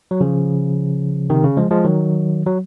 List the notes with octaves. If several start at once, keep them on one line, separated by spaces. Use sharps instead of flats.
F#3
C#3 F3
C3 D#3
C#3
F3 G#3
F3 G#3
D#3 F#3
F#3